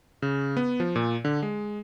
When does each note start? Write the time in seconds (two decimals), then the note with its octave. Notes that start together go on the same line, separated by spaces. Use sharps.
0.22 C#3
0.57 B3
0.80 F3
0.96 A#2
1.25 D3
1.42 G#3